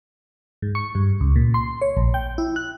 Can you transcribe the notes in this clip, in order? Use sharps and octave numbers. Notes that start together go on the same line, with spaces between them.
G#2
C#6
G2
C#2
A#2
C6
C#5
A#1
G5
E4
F#6